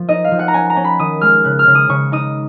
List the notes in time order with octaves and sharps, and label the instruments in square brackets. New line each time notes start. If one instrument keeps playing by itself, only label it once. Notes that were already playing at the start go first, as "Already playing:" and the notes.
Already playing: [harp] F3
D#4 D#5
F5
F3
F#5
A#5
C#4 G#5
A#5
C#4
B5
D#3 D#6
G#3 F6
C#3 F#6
F6
C#3
D#6
C#3 C#6
D#4 D#6